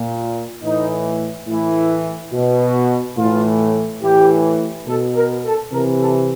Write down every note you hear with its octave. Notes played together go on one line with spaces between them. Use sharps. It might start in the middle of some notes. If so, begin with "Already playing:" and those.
Already playing: A#2
A2 E3 D#4
A2 E3 E4
B2
A2 E3 F4
A2 E3 G4
B2 A4
A#4
A4
C3 E3 A#4
A4